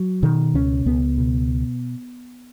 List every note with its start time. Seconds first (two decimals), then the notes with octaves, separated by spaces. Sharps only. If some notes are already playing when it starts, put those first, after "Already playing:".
Already playing: F#3
0.22 B2 D#3
0.54 C#2 C#4
0.86 C#2 B3
1.18 B2